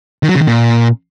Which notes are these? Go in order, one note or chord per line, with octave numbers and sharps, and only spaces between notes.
D#3
F#3
C#3
D#3
A#2